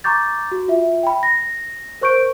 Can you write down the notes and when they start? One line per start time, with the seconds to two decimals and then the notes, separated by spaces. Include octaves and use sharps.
0.04 A#5 C#6 D6 G6 A6
0.52 F#4
0.68 F4 E5
1.03 G5 B5
1.23 A#6
2.01 A#4 C5 C#6 G6 D7